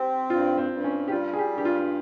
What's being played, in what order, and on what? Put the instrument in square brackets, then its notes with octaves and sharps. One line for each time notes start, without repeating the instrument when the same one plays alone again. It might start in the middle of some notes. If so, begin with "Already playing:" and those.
Already playing: [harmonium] C4 [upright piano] G4
[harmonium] G2 [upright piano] F4
[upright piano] C4
[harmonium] G2
[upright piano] C#4
G4
[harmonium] G3 [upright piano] F4
[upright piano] G#4
G4
[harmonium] G2
[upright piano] G4
F4